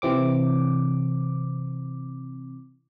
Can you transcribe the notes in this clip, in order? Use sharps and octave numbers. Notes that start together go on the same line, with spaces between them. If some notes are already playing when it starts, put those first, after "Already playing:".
C3 E3 C4 D6